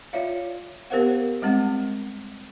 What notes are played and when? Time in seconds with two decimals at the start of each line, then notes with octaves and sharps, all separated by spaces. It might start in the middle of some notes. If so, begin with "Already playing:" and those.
0.13 F4 C#5 D5 E5 F5
0.90 B3 G4 A#4 C5 F5 F#5
1.42 G3 G#3 C4 F#5